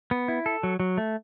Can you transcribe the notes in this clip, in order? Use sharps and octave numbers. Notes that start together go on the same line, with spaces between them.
B3
E4
A4
F#3
F#3
A3